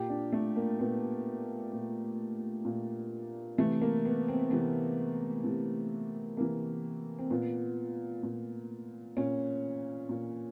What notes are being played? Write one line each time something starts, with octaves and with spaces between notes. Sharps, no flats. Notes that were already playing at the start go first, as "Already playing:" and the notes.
Already playing: A#2 G4
D4
A3
A#3
A#2 B3
A#2
A#2
C3 E3 A3
A#3
B3
C4
C3 E3 B3
C3 E3
C3 E3 A#3
C4
A#2 B3
A#2
A#2 C#4
A#2